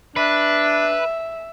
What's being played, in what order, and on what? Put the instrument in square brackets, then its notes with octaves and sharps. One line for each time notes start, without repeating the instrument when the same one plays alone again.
[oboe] D4 [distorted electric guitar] B4 [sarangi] E5